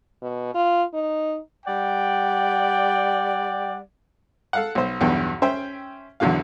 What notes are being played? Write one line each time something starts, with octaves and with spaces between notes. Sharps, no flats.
B2
F4
D#4
G3 D5 F#5 G5
A4 F5 F#5
B1 C5
B1 E2 G2 G5
C#4 C5 E5 G5
B1 E2 D3 F#3 F5